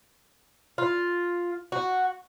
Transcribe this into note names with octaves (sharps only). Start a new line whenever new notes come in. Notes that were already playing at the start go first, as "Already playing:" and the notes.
F4
F#4